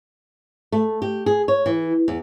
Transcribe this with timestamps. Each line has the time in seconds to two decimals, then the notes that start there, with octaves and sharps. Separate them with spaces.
0.72 A3
1.02 G4
1.26 G#4
1.48 C#5
1.66 E3
2.08 E2